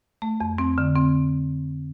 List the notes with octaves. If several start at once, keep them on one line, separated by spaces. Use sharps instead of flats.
A3
F2
C4
D3
C4